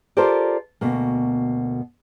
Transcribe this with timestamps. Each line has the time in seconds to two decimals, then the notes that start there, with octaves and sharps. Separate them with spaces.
0.17 F4 G4 A4 A#4 C5 D5
0.81 D2 B2 A#3